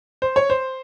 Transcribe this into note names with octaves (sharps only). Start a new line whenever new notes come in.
C5
C#5
C5